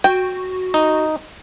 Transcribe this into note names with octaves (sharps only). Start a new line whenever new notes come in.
F#4 G5
D#4